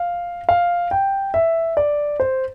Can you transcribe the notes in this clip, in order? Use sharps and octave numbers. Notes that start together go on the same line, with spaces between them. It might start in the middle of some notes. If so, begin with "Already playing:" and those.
Already playing: F5
F5
G5
E5
D5
C5